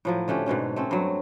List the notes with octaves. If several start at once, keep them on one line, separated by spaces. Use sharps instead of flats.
A2 F3 F#3
D3 A3 C#4 G4
G#2 B2 D3 C#4
A3 C4 C#4
G2 F#3